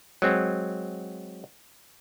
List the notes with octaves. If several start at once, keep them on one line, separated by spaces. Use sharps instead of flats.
F#3 G#3 C4